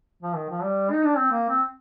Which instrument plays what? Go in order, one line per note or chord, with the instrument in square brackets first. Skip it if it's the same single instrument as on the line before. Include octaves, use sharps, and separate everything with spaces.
[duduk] F3
D#3
F3
G3
D#4
D4
C4
A#3
C4